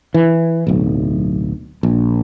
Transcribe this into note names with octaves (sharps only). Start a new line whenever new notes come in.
E3
D1 B1
A#1